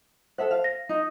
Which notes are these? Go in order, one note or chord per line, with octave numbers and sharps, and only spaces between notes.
A4 C5 E5 F#5
F5
A#6
D#4